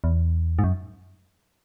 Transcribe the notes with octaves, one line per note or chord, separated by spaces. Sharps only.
E2
G#2
F#2